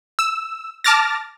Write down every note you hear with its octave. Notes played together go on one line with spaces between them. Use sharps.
E6
A5 D6 F6 A6 A#6